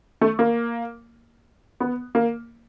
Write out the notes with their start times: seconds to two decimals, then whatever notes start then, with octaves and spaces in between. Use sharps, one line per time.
0.21 A3
0.39 A#3
1.80 B3
2.15 A#3